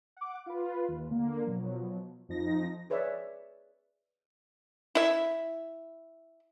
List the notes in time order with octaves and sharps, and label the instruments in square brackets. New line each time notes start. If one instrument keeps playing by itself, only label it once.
[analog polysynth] F#5 D6
F4 B4
D#2
D3 A#3
B2 F3 F#3
F2 F3 D#4 A#6
[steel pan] G#4 B4 C#5 D5 E5
[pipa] E4 E5